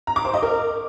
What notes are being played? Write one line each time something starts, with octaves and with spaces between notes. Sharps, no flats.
A#5
D6
C5
D#5
A#4